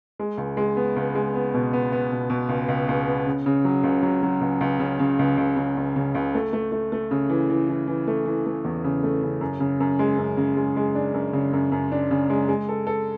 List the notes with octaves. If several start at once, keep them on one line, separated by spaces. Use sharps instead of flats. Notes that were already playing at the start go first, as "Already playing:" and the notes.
G#3
C#2
G#3
B3
C#2
G#3
B3
B2
B3
B3
B2
B2
C#2
C#2
C#2
B3
C#3
C#3
F#3
C#2
F#3
F#3
C#2
C#2
C#3
C#3
C#2
C#2
C#3
C#2
C#3
C#2
A3
A3
A3
A3
C#3
E3
E3
E3
E3
A3
E3
A3
E2
C#3
A3
C#3
F#2
C#3
F#2
G#3
F#2
C#3
G#3
G#3
D4
F#2
C#3
F#2
F#2
D4
C#3
G#3
G#3
A4
A4